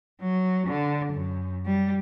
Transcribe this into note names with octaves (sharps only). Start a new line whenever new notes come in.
F#3
D3
F#2
G3